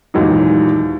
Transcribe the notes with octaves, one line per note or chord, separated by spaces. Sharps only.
D#2 A#2 E3 F#3 G#3 D#4